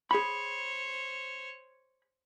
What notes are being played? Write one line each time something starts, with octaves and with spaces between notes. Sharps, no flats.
G#4 C5 C#5 B5